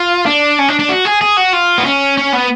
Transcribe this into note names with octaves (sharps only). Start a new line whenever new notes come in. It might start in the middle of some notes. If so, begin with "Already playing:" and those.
Already playing: F4
D4
C#4
D4
D4
F#4
G#4
G#4
F#4
F4
B3
C#4
C#4
B3